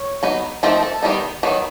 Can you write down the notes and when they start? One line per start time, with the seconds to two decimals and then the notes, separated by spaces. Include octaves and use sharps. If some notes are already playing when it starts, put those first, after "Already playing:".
Already playing: C#5
0.23 F#3 B3 D#4
0.63 F3 A3 C4 D#4 A#4
0.83 A4
1.03 D#3 G3 B3 D#4
1.43 D#3 F#3 B3